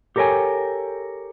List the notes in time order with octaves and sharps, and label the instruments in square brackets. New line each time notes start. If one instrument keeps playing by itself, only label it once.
[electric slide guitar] G4 A4 A#4 C#5 G5 G#5